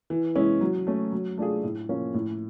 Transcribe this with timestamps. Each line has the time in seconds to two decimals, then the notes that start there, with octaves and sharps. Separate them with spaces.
0.10 E3
0.36 G#3 C#4 E4
0.61 F#3
0.87 A3 C#4
1.12 F#3
1.37 A3 D4 F4 G#4
1.63 A2
1.89 F3 A#3 C#4
2.14 A2